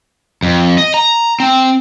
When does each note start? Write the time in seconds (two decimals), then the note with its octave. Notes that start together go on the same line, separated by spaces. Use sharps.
0.43 F2
0.78 D#5
0.94 A#5
1.40 C4